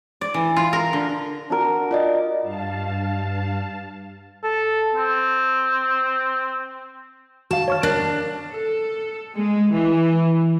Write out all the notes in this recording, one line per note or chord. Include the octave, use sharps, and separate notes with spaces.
D5
E3
F4
A#4
D3
D4 F#4 A#4
F4 D5 D#5
G2 F5 A5
A4
C4
F#4 F5 A5
C#5 C#6 F6
D4 A#4
A4
G#3
E3